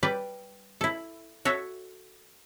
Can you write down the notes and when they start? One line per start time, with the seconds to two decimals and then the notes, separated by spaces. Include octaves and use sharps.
0.03 G3 B4 D5
0.81 E4 A4
1.45 F#4 A4 C#5 E5